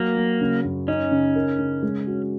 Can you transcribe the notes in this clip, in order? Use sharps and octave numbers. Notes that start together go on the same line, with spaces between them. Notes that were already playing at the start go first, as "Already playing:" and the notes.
Already playing: F#3 A#3
F#3
C#3
F#2
C#4 D#4
C#3
A#4
C#3
G#3
F#4